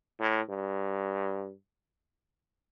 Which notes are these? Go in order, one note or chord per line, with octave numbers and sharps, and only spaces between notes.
A2
G2